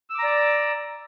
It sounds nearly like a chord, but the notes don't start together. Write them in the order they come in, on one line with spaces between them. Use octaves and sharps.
E6 D6 A#5 D5